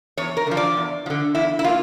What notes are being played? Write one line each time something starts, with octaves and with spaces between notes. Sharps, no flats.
E2 C#5
A#4
D3 F3
D5
E2
F3
D3
E2 E4
E4
A#3 F4